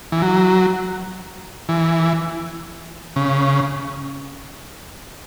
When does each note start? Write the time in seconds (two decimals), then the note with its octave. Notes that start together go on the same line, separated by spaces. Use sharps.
0.12 E3
0.22 F#3
1.69 E3
3.16 C#3